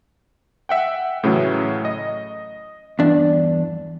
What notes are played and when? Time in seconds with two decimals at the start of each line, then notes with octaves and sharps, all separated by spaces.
0.69 E5 F#5 G5
1.23 A2 C#3 E3 F#3 A3 C#4
1.85 D#5
2.99 E2 G2 D4